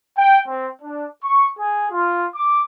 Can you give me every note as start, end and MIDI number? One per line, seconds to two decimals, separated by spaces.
0.17 0.39 79
0.47 0.68 60
0.82 1.07 62
1.23 1.48 85
1.59 1.87 68
1.92 2.27 65
2.35 2.61 86